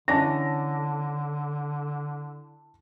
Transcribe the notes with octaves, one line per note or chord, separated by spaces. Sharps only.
D3 E3 C#4 D4 A5 A#6